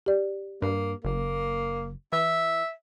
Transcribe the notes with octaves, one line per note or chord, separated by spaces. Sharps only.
G4 D5
G2 A#3
F#1 A#3
E3 E5